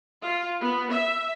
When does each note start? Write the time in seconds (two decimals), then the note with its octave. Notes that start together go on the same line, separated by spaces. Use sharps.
0.23 F4
0.59 B3
0.90 E5